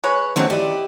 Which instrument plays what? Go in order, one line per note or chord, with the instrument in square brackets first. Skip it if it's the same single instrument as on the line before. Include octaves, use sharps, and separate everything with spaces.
[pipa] G#3 B4 C#5
[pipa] B2 F#3 C4 [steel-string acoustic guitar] D#3 A3 C#4
[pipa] G3 E4 [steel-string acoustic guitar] G4 D5 D#5